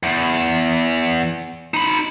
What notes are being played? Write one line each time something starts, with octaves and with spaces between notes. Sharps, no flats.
E2
D#4 B5